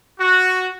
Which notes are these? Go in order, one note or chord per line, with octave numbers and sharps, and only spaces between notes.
F#4